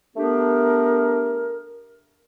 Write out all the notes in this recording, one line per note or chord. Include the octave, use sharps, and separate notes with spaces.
A3 B3 D4 G4 A#4